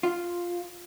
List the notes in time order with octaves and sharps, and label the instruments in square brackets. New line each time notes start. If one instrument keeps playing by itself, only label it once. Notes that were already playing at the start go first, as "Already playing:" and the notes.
[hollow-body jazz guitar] F4